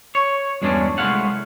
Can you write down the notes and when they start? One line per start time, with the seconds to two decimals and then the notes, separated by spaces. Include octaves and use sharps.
0.15 C#5
0.62 E2 G2 F#3 G#3 C#4 D4
0.98 C2 G#3 A3 E4 F5 F#5